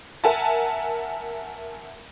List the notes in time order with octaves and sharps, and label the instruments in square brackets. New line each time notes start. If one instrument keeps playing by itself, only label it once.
[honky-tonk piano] A#4 E5 F#5 G#5 A5